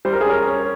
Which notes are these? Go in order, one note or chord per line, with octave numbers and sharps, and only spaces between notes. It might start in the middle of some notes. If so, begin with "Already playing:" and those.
G3 C5
A#4
G#4
C#4 A#4
C#4